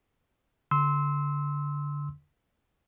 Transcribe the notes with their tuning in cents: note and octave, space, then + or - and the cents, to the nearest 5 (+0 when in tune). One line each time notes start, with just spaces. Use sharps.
D3 -25 C6 -5 E6 -25